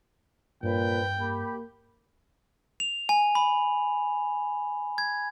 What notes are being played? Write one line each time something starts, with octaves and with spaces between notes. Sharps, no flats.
G2 A#2 B4 C5 G5
A#3 G4 B5
F7
G#5
B5
G#6